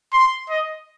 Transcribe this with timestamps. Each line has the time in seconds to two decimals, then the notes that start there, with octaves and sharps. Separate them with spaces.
0.14 C6
0.50 D#5